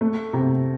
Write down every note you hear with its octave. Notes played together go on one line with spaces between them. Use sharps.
A3
C3